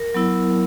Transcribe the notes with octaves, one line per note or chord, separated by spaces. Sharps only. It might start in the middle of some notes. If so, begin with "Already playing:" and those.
Already playing: A#4
F#3 B3 E4